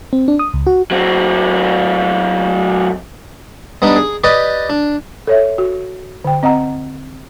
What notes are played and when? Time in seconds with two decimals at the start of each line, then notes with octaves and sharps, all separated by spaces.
0.13 C4
0.28 D4
0.39 D#6
0.54 C#2
0.67 F#4
0.91 F#3 C4
3.82 G3 B3 D4 D#4
3.96 G#4
4.24 G4 B4 D5 D#5
4.70 D4
5.27 A4 C#5 E5
5.58 F#4
6.25 D3 G5
6.43 C4 D#5 F#5 A#5